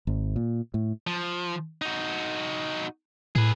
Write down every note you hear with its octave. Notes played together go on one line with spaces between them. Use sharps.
G#1
A#2
A2
F3
D#4 F#4
A2 G#4 B4